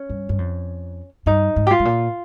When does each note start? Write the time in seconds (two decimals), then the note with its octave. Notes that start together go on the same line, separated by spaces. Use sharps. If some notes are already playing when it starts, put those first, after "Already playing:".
Already playing: C#4
0.09 G2
0.29 G2
0.38 F2
1.26 G2 D#4
1.56 G#2
1.67 G4
1.71 F4
1.79 G#2
1.85 A#2